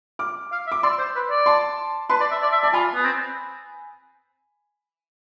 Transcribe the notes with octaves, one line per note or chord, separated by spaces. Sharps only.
D6 F6
F5
E5
D6
D5 C6 E6
C5
B4
D5
A5 C6
B4 A5 C6
D5
E5
D5
E5
D5 A5
F4 G#5 B5
B3
C4